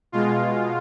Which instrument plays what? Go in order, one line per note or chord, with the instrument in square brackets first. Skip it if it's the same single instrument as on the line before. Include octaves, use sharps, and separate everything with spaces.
[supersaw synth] B2 G#3 F4